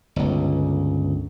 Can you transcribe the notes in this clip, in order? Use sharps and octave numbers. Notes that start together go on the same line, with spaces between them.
G1 C#2